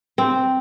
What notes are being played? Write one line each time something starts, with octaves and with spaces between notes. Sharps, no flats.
C4